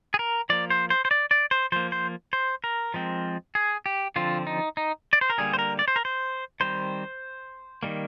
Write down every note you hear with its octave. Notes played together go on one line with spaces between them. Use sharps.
G#4
A#4
F3 A#3 D5
C5
C5
C5
D5
D5
C5
F3 A#3 C5
C5
C5
A#4
F3 G#3 C4
G#4
G4
D3 F3 C4 F4
D#4
D#4
D5
C5
A#4
D3 G3 A#3 G#4
C5
A#4
D5
C5
A#4
C5
D#3 G3 C4 C5
D#3 G3 A#3